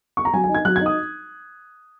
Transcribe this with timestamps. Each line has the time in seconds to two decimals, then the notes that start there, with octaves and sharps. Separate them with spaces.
0.17 C#6
0.25 A#5
0.33 F#3 G#5
0.44 G#5
0.49 D#4
0.55 G#6
0.65 F#3 F#6
0.76 G#6
0.81 D#4 D#6